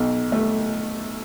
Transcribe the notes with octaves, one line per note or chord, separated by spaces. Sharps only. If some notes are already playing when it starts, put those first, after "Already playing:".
Already playing: B1
A3